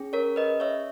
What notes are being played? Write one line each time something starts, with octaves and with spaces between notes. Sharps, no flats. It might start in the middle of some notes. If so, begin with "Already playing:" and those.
Already playing: C#4 G#4
A#4 C#5
B4 D#5
C#5 E5